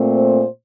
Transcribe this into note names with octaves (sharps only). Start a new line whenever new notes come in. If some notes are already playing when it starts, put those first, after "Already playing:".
Already playing: A#2 A3 C4
C5